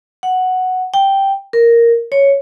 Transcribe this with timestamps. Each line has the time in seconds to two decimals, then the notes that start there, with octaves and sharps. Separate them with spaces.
0.23 F#5
0.94 G5
1.53 A#4
2.12 C#5